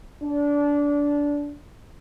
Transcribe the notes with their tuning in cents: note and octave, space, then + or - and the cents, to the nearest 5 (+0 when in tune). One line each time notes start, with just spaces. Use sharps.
D4 -20